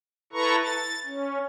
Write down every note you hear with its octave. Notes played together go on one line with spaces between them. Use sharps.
E4 A4 B4 A#5 C#6
A6
C#4